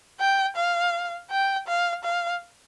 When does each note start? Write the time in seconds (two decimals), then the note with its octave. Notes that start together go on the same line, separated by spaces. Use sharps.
0.20 G5
0.56 F5
1.31 G5
1.67 F5
2.04 F5